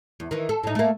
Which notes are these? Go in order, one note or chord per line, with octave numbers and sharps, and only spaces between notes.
E2
D#3 E3
A4
A2 D#4
A3 A#3